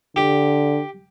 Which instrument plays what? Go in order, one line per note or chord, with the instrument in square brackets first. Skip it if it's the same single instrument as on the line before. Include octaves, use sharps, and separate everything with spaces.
[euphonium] D3 [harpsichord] G4